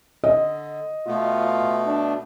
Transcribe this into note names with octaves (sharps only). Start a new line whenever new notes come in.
D3 D#5
B2 A3 B3 F4
D4